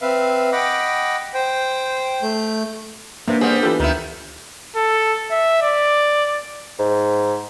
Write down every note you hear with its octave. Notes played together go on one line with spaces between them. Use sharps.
C4 B4 E5 F5
D#5 F#5 G5 B5 D6
C5 G5
A3 G6
C3 A#3 B3 D4
G3 C4 G#4 F#5
E3 F4 G4 A4
D2 D#3 E4
A4
E5
D5
G#2